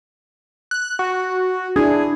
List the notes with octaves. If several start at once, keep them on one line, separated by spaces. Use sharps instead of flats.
F#6
F#4
D4 E4 G#4